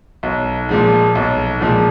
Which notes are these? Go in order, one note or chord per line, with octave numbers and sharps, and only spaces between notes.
B1
A#2 F3 G#3
B1
A#2 F3 G#3